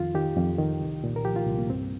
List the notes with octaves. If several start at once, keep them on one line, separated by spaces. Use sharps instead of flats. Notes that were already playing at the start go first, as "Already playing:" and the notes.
Already playing: F2 D#3 F4
D#3 G4
F2
D#3
C2
A#2
A#4
F3 G4
F4
C2
A#3
G2 C4